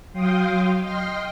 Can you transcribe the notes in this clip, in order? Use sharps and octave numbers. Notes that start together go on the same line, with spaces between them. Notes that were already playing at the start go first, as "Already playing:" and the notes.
F#3 F5 G5 C6 D#6
D#5 G5 C6 F6